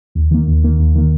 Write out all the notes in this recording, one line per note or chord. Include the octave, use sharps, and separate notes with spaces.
D#2
D#3 A#3
D#2
D#3 A#3
D#2
D#3 A#3